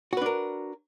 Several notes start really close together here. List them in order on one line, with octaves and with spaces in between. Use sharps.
F#4 B4 D4 A#4